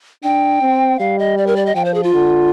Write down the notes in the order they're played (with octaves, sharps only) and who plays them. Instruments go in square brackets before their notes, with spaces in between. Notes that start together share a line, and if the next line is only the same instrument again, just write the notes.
[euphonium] D4 [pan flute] G5
[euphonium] C4
[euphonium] G3 [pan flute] F5
[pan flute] D#5
D5
A#4
D5
D#5
[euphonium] F3 [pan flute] G5
[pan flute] C5
G#4
F4
[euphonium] D3